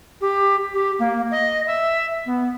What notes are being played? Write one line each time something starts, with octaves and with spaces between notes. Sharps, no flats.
G4
G4
A#3
D#5
E5
B3